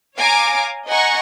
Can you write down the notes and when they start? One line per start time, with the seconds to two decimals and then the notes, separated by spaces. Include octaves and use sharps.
0.17 C#5 F5 G#5 A#5 D6 D7
0.87 D#5 F#5 G#5 A#5 C#6